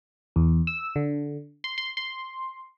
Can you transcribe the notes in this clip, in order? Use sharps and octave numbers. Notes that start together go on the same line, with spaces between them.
E2
E6
D3
C6
C6
C6